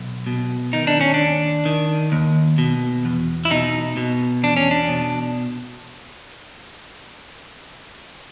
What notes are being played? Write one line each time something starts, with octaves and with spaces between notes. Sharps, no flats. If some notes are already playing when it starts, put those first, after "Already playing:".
Already playing: B1
B2
D#3 D#4
D4
C#4
D4
D#2
D#3
D#2
B2
E2
E4
B2 D#4
B2
E2 D4
C#4
D4
B2